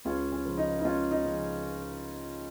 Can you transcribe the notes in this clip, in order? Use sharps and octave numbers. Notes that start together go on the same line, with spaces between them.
C#2 C#4 F4
C#4
C#3 F3
D#4
D#4
C#2 C#4 F4
D#4
C#3 F3